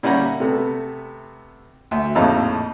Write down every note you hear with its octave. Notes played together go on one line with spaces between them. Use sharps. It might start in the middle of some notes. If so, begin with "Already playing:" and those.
A#2 G3 C#4 E5 F#5 A#5
C3 A3 B3
D2 E5
A#1 F2 A2 D#4 F5 E6